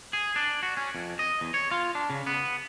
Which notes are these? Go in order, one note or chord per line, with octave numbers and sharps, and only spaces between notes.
G#4
D4
F#4
C#4
F2
D#5
E2
C#5
F4
D4
C#3
B3